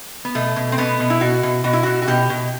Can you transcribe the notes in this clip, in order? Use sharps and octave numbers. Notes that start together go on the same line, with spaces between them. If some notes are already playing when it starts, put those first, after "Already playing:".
B3
B2 A3
B2
C4
B2 B3
B2
E4
B2 F#4
B2
B2 F#4
E4
B2 F#4
F#4
B2 G4
B2